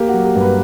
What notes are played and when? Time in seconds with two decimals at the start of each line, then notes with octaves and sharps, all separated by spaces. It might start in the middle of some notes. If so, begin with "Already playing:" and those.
Already playing: A#3 G4
0.09 F#4
0.14 F#3
0.25 G4
0.35 G2
0.41 B4